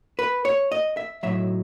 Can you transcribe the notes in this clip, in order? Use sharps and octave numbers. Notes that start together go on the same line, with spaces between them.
B4
C#5
D#5
E5
B1 A2 F#3 E5